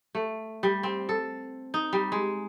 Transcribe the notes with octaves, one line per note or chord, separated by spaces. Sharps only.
A3
G3
C4
A4
D#4
G3
G#3